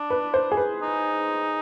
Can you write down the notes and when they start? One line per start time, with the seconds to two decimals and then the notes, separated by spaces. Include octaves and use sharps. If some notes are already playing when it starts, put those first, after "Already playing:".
Already playing: D4
0.10 B4
0.34 C5
0.52 G#4
0.57 B4
0.82 D#4